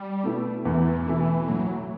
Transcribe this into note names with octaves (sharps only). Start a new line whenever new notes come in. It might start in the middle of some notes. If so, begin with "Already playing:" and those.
Already playing: G3
B2 A3 E4
E2 E3
B2 A3 E4
A2 F#3